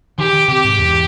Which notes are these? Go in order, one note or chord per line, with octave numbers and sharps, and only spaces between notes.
D#3 G4
D#3
C3 G4
G#2
E2